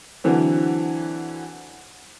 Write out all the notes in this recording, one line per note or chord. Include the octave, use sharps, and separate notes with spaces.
D3 E3 F#3 C4